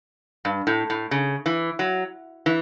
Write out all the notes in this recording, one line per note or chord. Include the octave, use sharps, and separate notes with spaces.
G2
A2
A2
C#3
E3
F#3
E3